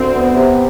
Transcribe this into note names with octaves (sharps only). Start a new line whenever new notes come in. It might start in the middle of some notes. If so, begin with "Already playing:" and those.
Already playing: D2 C4
B3
C3